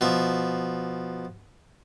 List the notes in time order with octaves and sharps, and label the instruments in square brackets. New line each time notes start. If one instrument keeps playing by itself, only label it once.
[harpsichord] B2 F3 E5